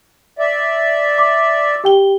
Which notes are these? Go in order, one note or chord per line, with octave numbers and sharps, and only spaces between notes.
D5 E5
D6
G4 G5 G7